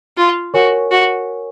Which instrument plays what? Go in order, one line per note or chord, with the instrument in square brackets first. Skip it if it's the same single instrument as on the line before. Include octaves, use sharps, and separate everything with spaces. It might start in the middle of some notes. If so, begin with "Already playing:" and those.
[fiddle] F4
[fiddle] F#4 [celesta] A#4 C#5 G#5 C#6
[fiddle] F#4